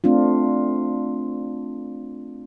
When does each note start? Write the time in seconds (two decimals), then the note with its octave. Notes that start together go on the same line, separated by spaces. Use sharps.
0.04 A3 C4 D4 F4